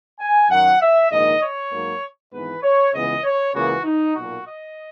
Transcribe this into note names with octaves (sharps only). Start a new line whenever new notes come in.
G#5
F#2 D#3 F#3 F#5
E5
A#1 G#2 D#3 A#3 D#5
C#5
G#2 F#3 A#3
G#1 G#2 E3 B3 B4
C#5
C#2 C#3 E3 B3 D#5
C#5
C#2 C#3 E3 A#3 F#4
D#4
B1 A#2 A#3 F#4
D#5